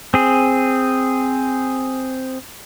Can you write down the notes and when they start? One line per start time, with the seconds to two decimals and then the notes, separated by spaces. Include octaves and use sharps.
0.14 C4 G#4